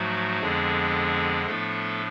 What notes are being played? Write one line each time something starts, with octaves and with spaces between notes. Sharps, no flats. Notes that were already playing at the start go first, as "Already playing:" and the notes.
Already playing: G#2 F3 F#3 A3 F#4
F2 D3 F3 G#3 B3 D4 G#4
A2 F3 A3 B3 D4 A4